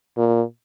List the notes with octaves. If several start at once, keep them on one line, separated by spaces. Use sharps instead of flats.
A#2